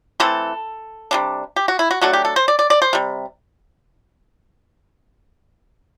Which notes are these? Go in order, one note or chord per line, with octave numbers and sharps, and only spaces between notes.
E3 A3 C4 A4
C3 G3 D4
G4
F#4
E4
F#4
F#3 A3 D4 F#4
G4
A4
C5
D5
D5
D5
C5
C3 G3